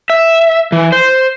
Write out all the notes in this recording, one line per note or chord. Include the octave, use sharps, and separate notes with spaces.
E5
E3
C5